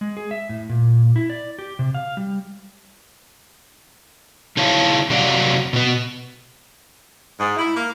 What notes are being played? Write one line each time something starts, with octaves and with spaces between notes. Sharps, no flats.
G#3
G#4
E5
A2
A#2
E4
D5
G4
C3
F5
G3
C#3 D#4 E4 C#5 F5 A5
C3 F#3 D5 F5 F#5
B2 B3
G#2
E4
A#3